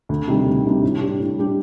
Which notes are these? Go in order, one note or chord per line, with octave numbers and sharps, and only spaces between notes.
D2
C3 D#3 G3 D4
D2
C3 D#3 G3 D4
A2
G3 D4 G4
A2
G3 D4 G4